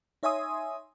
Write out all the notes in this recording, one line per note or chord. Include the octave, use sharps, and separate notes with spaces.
D#4 C#5 E5 G#5 C6 D#6